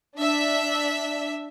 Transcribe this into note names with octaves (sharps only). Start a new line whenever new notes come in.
D4 E5